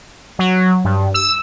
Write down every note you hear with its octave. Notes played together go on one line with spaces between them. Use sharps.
F#3
G2
E6